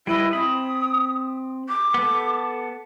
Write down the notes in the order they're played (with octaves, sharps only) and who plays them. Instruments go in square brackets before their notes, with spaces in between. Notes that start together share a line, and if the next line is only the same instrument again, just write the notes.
[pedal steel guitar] G3 B4 D#5 [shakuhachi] E4
[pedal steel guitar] C4 B5 [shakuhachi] D#6
[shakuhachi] D6
[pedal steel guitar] B3 A4